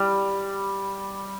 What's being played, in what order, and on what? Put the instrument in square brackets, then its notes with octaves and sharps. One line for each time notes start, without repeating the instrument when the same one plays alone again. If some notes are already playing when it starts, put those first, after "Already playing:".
Already playing: [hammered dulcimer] G3